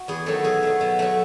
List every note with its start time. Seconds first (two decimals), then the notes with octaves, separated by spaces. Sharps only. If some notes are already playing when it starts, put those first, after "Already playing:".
Already playing: F#4
0.08 E2 G#4
0.26 D#3 F#3 A3 A4
0.44 B2 G#4
0.63 F#3 A3
0.81 B2
0.99 F#3 A3